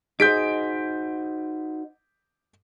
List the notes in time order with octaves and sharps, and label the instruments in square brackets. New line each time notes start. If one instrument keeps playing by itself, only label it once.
[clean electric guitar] D#4 F#4 C5 [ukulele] G#4 D#5 [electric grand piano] G6 B6 D7